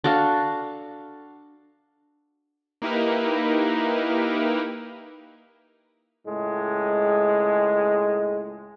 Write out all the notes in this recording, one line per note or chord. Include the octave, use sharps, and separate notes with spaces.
D4 F#4 A4 F5
A#3 D#4 E4 G4 A#4 B4
C#2 A2 G#3